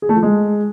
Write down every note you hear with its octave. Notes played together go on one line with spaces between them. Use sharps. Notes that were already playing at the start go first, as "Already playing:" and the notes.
G#4
A3
F3
G#3